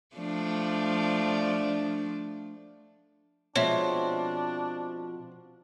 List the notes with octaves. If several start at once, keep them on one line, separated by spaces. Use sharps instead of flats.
F3 A3 D4
B2 F3 G#3 C4 D4 C#5 E5